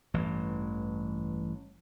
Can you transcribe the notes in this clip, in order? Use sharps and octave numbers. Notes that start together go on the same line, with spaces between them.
A1 G2 E3